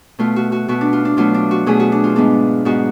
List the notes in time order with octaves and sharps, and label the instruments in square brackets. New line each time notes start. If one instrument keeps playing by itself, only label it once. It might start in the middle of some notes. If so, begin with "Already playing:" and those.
[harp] B2 A3 F4
F#4
F#4
B2 A3 F#4
D4
F4
D4
B2 F#3 A3 F4
D4
F#4
B2 F#3 A3 G#4
F#4
D4
F4
G#2 G#3 B3 D4
G#2 G#3 B3 F#4